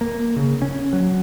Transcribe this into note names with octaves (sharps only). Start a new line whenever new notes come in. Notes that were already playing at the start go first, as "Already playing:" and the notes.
A#3
C#3
C#4
F#3